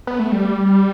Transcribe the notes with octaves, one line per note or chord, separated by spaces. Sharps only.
B3
A3
G3